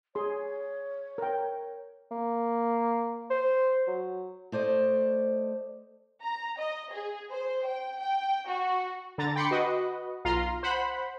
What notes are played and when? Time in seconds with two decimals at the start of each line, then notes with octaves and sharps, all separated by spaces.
0.15 G#4 C#5 C6
1.18 A#4 G5
2.11 A#3
3.30 C5
3.87 F#3
4.52 A3 C5 D5 D#5
6.22 A#5
6.59 D#5
6.92 G#4
7.31 C5
7.66 G5
7.99 G5
8.48 F#4
9.18 D3 A#5 A6
9.36 G5 B5 C6 D6 C#7
9.51 F#4 B4 D#5
10.25 B1 F4 F5 A#5 C6
10.63 C5 F#5 B5